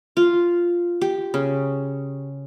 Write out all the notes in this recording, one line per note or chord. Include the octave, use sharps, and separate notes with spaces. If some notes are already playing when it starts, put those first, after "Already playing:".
F4
G4
C#3